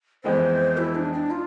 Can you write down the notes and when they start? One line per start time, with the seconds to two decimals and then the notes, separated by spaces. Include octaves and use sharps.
0.24 F2 E3 G#3 B3 C5
0.78 E4
0.95 D4
1.13 D4
1.31 F4